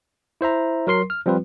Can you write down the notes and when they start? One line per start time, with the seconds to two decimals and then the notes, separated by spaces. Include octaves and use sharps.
0.41 E4 C5 E5 A#5
0.87 F#3 A#4 C6 C7
1.10 F6
1.26 F3 G3 C4 F4 B4